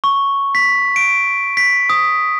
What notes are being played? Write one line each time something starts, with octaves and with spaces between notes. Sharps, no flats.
C#6
B6
D7
B6
D#6